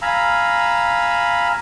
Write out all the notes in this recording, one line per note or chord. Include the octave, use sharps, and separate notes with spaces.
F5 G#5 A#5 B5 E6